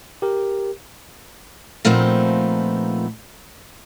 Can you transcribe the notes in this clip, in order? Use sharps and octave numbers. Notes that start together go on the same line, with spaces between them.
G4 A#4
A#2 F3 A3 B3 C4 D#4